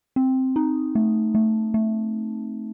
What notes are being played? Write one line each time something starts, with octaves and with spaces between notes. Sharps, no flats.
C4
D#4
A3
A3
A3